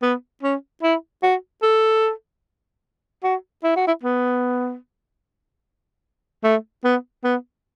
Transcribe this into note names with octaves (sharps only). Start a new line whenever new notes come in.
B3
C#4
E4
F#4
A4
F#4
E4
F#4
E4
B3
A3
B3
B3